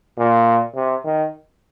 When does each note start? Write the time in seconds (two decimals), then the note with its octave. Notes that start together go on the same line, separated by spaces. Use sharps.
0.19 A#2
0.75 C3
1.05 D#3